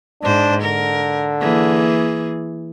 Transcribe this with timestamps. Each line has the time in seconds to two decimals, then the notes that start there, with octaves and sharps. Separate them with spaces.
0.22 G#2 D4 C5
0.62 D3 A#4
1.41 E3 A#3 G#4